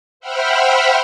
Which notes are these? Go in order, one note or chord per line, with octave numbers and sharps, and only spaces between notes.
C5 E5 F#5 G5 B5 F6